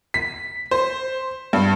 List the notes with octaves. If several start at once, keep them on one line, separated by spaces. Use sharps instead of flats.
B6
C5
G2